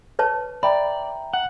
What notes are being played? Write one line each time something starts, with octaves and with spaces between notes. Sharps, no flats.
B4 C#5 A5
D5 E5 G5 A#5 B5
F#5